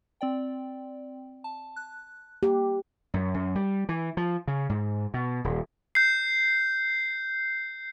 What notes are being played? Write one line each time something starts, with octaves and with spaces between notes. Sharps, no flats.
C4 D5 G5
A5
F#6
A#3 G4
F#2
F#2
G3
E3
F3
C#3
G#2
B2
D#1
G6 C7